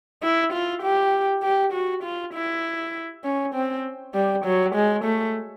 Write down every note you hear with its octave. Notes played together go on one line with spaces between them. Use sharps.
E4
F4
G4
G4
F#4
F4
E4
C#4
C4
G3
F#3
G#3
A3